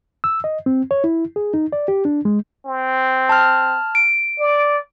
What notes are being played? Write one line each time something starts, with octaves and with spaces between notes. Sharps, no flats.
E6
D#5
C4
C#5
E4
G#4
D#4
D5
G4
D4
G#3
C4
A5 F6
D7
D5